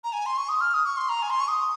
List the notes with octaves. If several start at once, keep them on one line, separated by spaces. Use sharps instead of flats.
A#5
G#5
C6
C#6
D#6
F6
D#6
C#6
C6
A#5
G#5
C6
C#6
D#6